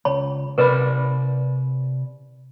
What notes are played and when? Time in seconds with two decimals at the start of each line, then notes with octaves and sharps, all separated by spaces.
0.05 C#2 C#5 B5
0.58 C3 A#4 B4 D5 B5